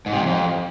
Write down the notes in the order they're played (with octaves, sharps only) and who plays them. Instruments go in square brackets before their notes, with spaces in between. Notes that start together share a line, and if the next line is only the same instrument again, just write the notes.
[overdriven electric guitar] G#2
C3
E2
F2